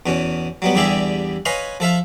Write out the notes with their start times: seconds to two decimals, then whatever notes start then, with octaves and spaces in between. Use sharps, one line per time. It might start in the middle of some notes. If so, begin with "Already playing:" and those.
0.06 E2 B2 C#4
0.62 F#3 G3 B3
0.75 E2 D3 G3 G4 G#4 E5
1.45 B4 C#5 D#5 F5 G#5 C6
1.80 F3 A4 E5 F5